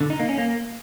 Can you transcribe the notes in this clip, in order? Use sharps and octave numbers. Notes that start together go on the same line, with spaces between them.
D3
D#4
A#3
C#4
A#3